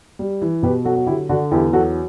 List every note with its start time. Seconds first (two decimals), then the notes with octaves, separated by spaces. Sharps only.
0.19 G3
0.42 E3
0.62 B2 G4 B4
0.84 F#3 F#4 A4
0.96 F#4
1.06 D3 E4 G4
1.29 D3 D4 F#4
1.51 E2 E4 G4
1.73 F#3 F#4 A4